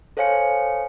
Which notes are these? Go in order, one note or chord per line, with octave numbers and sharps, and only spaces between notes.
A4 C5 C#5 F5 G#5 C#7